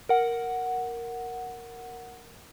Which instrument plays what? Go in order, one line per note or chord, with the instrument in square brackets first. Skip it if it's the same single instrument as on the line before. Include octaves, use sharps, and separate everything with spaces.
[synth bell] A#4 F#5